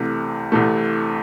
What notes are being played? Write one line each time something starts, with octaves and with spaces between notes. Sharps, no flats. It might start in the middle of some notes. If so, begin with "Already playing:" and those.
Already playing: C2 C3 E3 A3
C2 C3 E3 A3